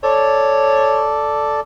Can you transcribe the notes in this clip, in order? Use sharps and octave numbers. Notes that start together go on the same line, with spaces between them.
A4 C#5 D5